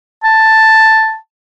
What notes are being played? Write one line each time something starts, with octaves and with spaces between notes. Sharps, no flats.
A5